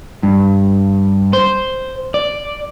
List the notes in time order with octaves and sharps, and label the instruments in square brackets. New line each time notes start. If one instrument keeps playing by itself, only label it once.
[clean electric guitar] G2
C5
D5